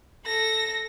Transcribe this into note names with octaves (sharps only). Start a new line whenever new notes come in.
A4 A#6